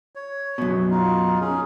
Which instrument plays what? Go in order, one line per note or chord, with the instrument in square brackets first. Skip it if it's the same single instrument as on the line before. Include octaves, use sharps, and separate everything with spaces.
[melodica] C#5
[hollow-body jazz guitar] F#2 B2
[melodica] D#4 F4
C#4 G#4